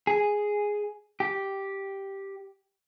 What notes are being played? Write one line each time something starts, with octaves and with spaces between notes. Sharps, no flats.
G#4
G4